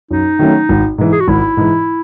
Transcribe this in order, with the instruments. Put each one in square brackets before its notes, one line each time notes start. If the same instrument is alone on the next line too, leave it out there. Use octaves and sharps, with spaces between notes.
[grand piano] F#2 [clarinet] D#4
[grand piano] D#3 F#3 A3 C#4
G#1
G#2 E3
[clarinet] G#4
F#4
[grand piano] G#1 [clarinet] E4
[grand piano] G#2 E3